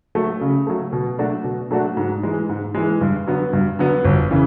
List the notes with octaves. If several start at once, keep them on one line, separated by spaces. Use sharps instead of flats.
F#3 A3
C#3
F#3 A3
B2
F#3 A3 D4 F#4
B2
F#3 A3 D4 F#4
G#2
E3 G#3
G#2
E3 G#3
G2
D3 F#3 B3
G2
D3 F#3 B3
G1
C#3 E3